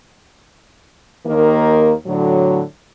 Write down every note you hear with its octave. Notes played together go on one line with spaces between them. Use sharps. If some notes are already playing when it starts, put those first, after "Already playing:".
D#2 D#3 A#3
A2 D3 F#3